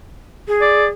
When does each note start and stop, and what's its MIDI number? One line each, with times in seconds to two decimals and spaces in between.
0.48 0.90 68
0.62 0.87 74